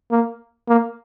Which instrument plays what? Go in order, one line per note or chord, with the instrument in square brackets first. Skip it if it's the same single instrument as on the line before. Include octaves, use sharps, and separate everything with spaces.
[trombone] A#3
A#3